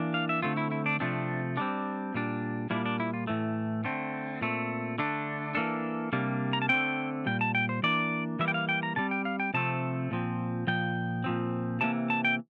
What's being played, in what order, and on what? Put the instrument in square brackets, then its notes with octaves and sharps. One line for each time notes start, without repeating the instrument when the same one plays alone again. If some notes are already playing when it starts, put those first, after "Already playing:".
Already playing: [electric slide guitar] E3 A#3 D4
F5
E5
D3 A3 C4 F4
E4
E4
D4
C3 F3 A3 C4 D4
D3 G3 C4 D4
A#2 G3 D4
A#2 G3 A#3 D4 E4
D4
E4
F4
A2 E3 A3
D3 A3 C4
A#2 A3 C4
D3 A3 D4
E3 A#3 D4 A4
C3 G3 A#3 D4
A#5
A5
D3 A3 C4 G5
A#2 G3 G5
A5
G5
C5
E3 A#3 D4 D5
E3 G3 A#3 E5
G5
F5
G5
A#5
C3 G3 C4 A5
G5
F5
G5
C3 F3 A3 C4 A5
A#2 F3 C4
A#2 F3 G5
A#2 F3 C4
C3 E3 A#3 A5
A5
G5